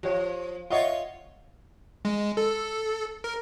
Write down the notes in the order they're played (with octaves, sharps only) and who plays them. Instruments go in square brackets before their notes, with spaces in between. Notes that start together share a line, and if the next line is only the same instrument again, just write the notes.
[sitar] F3 [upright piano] G4 C#5
[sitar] F4 C#5 [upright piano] D#5 E5 F#5
[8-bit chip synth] G#3
A4
A#4